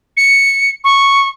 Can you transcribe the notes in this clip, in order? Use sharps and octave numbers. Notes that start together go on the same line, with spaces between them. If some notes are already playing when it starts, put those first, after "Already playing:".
C#7
C#6